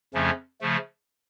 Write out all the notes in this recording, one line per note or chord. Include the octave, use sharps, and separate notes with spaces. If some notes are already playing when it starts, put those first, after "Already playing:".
F2 C#3 F3 A3 C#4
C#3 F3 A3